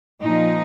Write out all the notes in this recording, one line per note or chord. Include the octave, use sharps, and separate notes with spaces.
A#2 F3 D#4